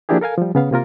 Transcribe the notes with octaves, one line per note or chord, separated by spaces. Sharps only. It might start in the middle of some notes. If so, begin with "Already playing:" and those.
F3 A#3 D4 E4 G4 G#4
A4 A#4 F5 G#5
F3 G3
C#3 B3 F5
C3 A#3 F4 A#4